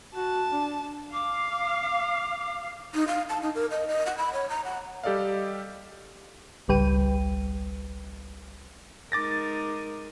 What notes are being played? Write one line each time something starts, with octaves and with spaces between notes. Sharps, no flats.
F#4 A5
D4
F5 D6
D#4
F5
A5
D#4
A#4
D#5
D#5
F#5
B5
C#5
A#5
F#5
G3 G4 A4 D5 D#5 F5
G#1 C#2 G3 B4 G5 D#7
G#3 D#4 A#4 D6 A6 A#6